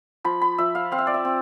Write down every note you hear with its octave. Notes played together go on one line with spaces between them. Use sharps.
F3 B5
B5
F3 E5
F5
C4 F5
E5
D5
E5
C4